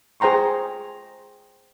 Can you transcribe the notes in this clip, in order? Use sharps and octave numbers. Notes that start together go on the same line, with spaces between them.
G#4 C5 G5 A#5 C6 C#6